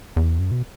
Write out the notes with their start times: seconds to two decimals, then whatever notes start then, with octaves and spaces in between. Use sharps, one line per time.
0.16 E2
0.39 F#2
0.51 B2